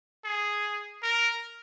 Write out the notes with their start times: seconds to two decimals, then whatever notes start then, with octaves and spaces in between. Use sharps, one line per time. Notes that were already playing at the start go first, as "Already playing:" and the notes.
0.24 G#4
1.03 A#4